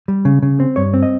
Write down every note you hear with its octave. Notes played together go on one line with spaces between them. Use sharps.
G3
C#3
C#3
C4
G2 C#5
C4
D#5